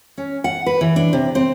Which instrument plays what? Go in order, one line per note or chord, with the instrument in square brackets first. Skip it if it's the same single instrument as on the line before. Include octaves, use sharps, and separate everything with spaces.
[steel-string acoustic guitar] C#4
F#5
B4
E3
D4
C3
C4